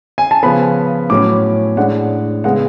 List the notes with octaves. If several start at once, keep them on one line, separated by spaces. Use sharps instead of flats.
G#5
A5
C#3 F3 B3 B5
A2 F#3 C#4 D6
A2 G#3 D4 F#5
C#3 G#3 B3 F#5